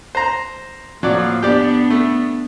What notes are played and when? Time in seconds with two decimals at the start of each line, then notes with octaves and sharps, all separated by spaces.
0.15 C5 A#5
1.03 A2 F3 F#3 A#3 D5
1.43 B3 D4 G4 D5
1.90 A3